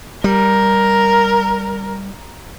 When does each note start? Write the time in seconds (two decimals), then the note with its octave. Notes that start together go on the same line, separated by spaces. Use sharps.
0.24 G3 A#4